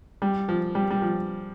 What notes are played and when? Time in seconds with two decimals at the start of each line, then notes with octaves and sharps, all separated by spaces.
0.22 G3
0.49 F3
0.75 G3
0.90 G3
1.02 F3